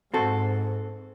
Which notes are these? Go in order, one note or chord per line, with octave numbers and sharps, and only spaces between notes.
G#2 C4 F#4 A4